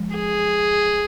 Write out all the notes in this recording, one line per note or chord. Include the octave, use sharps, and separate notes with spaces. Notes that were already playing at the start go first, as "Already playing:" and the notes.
Already playing: F3 G#3
G#4